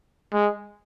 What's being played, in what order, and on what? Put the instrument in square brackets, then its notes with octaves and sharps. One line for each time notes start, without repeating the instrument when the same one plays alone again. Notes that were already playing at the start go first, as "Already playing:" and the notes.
[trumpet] G#3